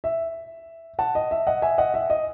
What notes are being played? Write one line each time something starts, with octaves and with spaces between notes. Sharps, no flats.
E5
F#5 A5
D#5
E5
D#5 F#5
E5 G#5
D#5 F#5
E5
D#5